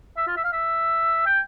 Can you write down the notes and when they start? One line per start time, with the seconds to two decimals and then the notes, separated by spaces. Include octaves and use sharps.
0.17 E5
0.27 F4
0.37 E5
0.45 F5
0.53 E5
1.26 G5